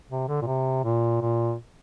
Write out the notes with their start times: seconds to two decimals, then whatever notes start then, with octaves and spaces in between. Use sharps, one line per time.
0.10 C3
0.29 D3
0.42 A#2
0.47 C3
0.84 A#2
1.21 A#2